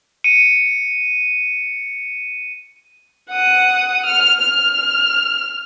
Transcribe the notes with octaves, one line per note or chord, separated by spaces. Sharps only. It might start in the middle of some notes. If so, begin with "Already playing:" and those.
C#7 D#7
F#5 D#6
F6
F6